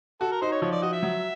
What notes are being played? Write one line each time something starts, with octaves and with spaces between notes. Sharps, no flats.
F#4 A4
A#4
D#4 C5
C#5
F3 C#5
D5
F#4 D#5
E5
F#3